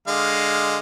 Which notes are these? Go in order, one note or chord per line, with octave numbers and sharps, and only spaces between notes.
D3 G#3 F5